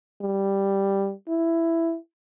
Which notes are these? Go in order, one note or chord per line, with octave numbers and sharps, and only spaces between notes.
G3
E4